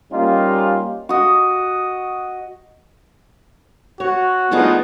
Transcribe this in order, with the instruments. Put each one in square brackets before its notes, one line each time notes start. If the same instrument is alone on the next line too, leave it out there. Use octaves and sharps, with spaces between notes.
[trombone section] G3 A#3 C#4 D#4 F4 G4
[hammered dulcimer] F#4 D#5
[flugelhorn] F#4 [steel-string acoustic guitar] C#5
[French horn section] F3 A3 D#4 [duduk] B3 [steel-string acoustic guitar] D4 F4 G#4